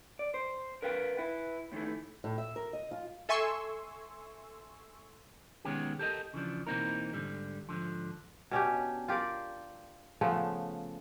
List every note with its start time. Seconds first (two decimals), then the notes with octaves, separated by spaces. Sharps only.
0.19 D5
0.34 C5
0.82 A#4 B4 F5 G5
1.17 E4 B4
1.72 A2 D#3 E3 A3
2.24 A2
2.38 E5
2.56 A#4
2.73 D#5
2.91 F4
3.29 A4 E5 G#5 C6 C#6 E6
5.65 B1 D#3 G#3 B3 C#4 G4
5.99 G4 A4 A#4 D#5
6.34 C#3 E3 F3 D4
6.67 B2 E3 A#3 C4 D#4 A#4
7.13 G#2 D3 G3
7.69 G#2 D3 F3
8.51 B2 C#4 D4 G4
9.08 F4 G4 A#4 D5
10.21 C#3 F3 A3 B3